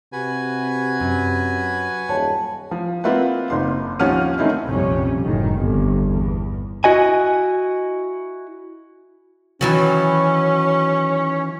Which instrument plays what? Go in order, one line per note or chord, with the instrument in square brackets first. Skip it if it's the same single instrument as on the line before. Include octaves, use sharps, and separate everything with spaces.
[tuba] C3 [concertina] F#4 B4 G#5
[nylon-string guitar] F#2
[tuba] D#1 [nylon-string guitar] C#5 [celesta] A5
[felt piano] F3
A#3 C4 F4 B4 E5 F#5
F#1 D#4 C6
D#2 F3 C#4 F#5 F6 D#7
D#3 A3 C4 C#4 D#4 E4
[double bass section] A#1 F2 C3 G3 C#4
F#1 A2 D#3
G1 F2
E2
[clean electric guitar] E4 F#4 D#5 G#5
[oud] D#3 E3 F#3 [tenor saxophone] C#4